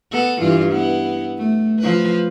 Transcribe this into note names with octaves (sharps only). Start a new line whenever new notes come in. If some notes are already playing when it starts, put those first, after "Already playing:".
B3 A4
G2 E3 F4
B3 E4
A3
F3 B4